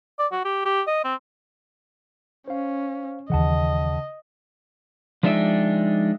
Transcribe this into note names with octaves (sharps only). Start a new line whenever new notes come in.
D5
F#4
G4
G4
D#5
C4
C#4 C5 F5
D#2 C#3 E3 D#5 F#5 A5
F3 G#3 D4 D#4 E5 G5